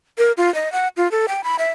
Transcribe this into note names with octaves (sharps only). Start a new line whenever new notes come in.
A#4
F4
D#5
F#5
F4
A4
G5
B5
E5